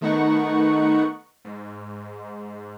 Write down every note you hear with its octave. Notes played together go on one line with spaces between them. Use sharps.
D#3 A3 B3 D#4 F#5 C#6
G#2